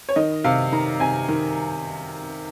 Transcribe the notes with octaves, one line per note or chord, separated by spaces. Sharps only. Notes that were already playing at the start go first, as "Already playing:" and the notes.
C#5
D#3 D#5
C3 F5
D#3 A#5
C3 G#5
D#3